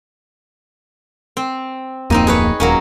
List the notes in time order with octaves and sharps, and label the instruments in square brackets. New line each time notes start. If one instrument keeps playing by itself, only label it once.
[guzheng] C4
[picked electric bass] D1 F2 A#3 [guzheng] C4 D#4 D#5
[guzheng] G#4 B4 C#5
[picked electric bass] D#1 [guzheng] F#3 A#3 C#4